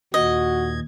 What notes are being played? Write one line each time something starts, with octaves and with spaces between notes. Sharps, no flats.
D#2 A#2 F#4 D#5 G#6